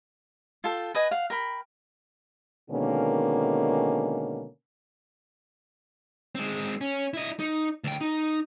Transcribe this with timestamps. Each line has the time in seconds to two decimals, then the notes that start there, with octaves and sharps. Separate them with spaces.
0.64 F4 A4 G5
0.95 B4 D#5 G#5
1.11 F5 F#5
1.30 A#4 G5 B5
2.70 B2 D3 D#3 G#3 A#3 C#4
6.35 G#3 C4
6.81 C#4
7.14 E4 D#5
7.40 D#4
7.84 D2 G5
8.01 D#4